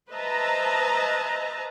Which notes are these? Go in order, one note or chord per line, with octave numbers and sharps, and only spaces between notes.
B4 C5 D#5 E5 A5 A#5